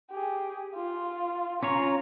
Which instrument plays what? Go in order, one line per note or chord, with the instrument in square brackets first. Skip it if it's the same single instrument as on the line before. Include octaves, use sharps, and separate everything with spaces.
[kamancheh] G4 G#4
F4
[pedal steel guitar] C#4 F4 C#5 [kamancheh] A#5